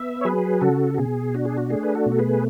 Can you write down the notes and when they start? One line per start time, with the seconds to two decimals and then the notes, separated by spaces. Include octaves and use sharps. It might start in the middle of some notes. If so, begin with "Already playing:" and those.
Already playing: B3 E5
0.21 C#5
0.25 F#3 G#4 B4
0.61 C#3 F#4 A4
0.94 F#4
0.98 B2 G#4
1.34 D4 F#4
1.45 G#4
1.58 F#4
1.70 A3 G#4
1.83 B4
1.95 F#4 A4
2.06 B2
2.11 A4
2.18 G#4 B4